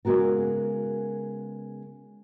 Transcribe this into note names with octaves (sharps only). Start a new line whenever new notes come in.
C#3 G#3 B3 F#4 A#4